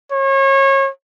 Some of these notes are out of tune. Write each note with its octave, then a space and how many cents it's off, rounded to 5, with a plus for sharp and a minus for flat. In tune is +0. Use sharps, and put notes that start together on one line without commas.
C#5 -30